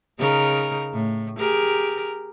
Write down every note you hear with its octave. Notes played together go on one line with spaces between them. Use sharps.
C#3 D#4 A#4
A2
G4 G#4 A#4